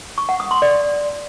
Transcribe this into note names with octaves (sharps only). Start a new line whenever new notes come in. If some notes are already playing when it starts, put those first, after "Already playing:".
C#6
F#5
D#6
C6
D5